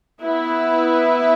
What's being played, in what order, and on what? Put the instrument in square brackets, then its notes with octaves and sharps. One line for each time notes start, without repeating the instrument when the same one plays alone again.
[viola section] B3 E4 B4 E5